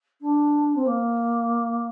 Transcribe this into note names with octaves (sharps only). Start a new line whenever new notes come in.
D4
C4
A#3